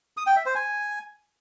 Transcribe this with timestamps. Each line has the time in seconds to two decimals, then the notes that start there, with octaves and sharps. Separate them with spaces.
0.17 D#6
0.27 G5
0.36 E5
0.46 C5
0.55 G#5